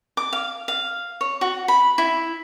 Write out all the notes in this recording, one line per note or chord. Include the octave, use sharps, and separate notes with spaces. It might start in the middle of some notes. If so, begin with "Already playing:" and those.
D6
F5
F5
C#5
F#4
B5
E4